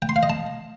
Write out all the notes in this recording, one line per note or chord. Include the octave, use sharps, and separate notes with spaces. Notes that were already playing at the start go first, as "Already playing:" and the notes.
G5
C6
F5
D#5
A5